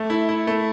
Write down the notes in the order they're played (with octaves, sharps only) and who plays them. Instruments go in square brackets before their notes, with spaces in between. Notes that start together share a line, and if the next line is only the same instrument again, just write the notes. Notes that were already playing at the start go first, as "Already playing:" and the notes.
Already playing: [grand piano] A3
E4
E4
A3